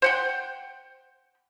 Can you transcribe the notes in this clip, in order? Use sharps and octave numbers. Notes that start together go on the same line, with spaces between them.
C5 F#5 G5